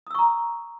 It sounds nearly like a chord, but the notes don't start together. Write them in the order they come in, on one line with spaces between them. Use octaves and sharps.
D#6 E6 C#6 A#5